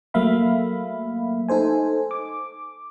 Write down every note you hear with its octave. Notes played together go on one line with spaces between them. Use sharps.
F#3 A3 A#3 E5 F5 B5
D#4 A4 C5 G#5
D6